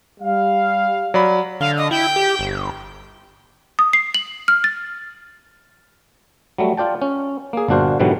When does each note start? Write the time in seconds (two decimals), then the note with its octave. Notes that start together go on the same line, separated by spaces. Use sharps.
0.21 G3 F5
1.14 F#3 D5 B5
1.61 D3 F5
1.77 D#5
1.91 E4 G5
2.16 G4
2.39 G1
3.79 D#6
3.93 C7
4.14 F#7
4.48 F6
4.64 A6
6.58 F#3 G3 A3
6.77 F4 D5 G5 A5
7.02 C#4
7.53 A#3 G#4
7.68 G1 A#2 D4 F#4 C5 F5
8.00 G#2 B2 D3 E3 F#3 G3